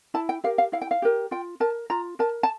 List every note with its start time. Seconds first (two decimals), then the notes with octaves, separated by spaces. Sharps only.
0.14 E4 A5
0.29 G5
0.44 G4 A#4 F5
0.58 F5
0.72 E4 F5
0.82 G5
0.91 F5
1.02 G4 A#4
1.31 F4 G5
1.60 A#4 A5
1.90 F4 A#5
2.19 A#4 A5
2.43 A5